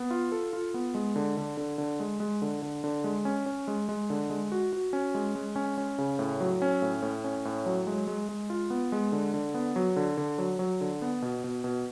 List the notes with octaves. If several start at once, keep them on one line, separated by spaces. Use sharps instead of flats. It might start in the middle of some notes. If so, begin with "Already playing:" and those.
Already playing: B3
F4
A4
F4
B3
G#3
D3
D3
D3
D3
G#3
G#3
D3
D3
D3
G#3
C#4
C#4
G#3
G#3
D3
G#3
F#4
F#4
C#4
G#3
G#3
C#4
C#4
C#3
A2
F#3
C#4
A2
A2
C#4
A2
F#3
G#3
G#3
G#3
F4
B3
G#3
D3
D3
B3
F#3
D3
D3
F#3
F#3
D3
B3
B2
B2
B2